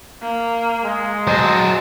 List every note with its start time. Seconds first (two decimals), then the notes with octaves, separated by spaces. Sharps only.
0.22 A#3
0.83 G#3
1.27 F#3 C5 D#5 A5